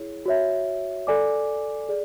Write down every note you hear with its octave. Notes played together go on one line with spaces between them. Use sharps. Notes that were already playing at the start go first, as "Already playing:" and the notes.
Already playing: E4 G#4 C#5
F#4 C#5 E5
A4 D5 G#5 D6
G#4 D5